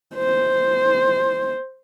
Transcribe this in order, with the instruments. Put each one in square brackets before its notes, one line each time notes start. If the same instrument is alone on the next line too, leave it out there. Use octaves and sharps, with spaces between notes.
[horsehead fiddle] C5